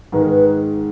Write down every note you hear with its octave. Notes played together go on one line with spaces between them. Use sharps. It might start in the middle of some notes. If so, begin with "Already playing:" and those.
G#2 D#3 G#3 B4
A#4
B4